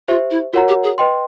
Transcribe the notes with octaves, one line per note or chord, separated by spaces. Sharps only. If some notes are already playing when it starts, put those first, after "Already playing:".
F4 G4 C5 E5
E4
F4 F#4 A#4 C#5 F#5 A#5
G4
G#4
B4 D#5 G5 C6